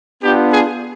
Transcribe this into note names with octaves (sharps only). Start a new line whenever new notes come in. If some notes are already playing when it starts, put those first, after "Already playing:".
B3 D4 F4 G4
G#4